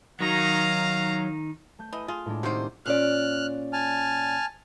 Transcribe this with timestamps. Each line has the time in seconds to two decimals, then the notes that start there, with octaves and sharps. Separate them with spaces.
0.21 D#3 F#3 D#4 F5 A#5
1.79 A3 G6
1.93 E3 D#5
2.08 F4 G#4
2.26 A2 G#3 D4
2.43 C3 D#3 A#3 F#4 C5
2.86 A#2 C#4 D5 F6 F#6
3.73 G#5 A5 F6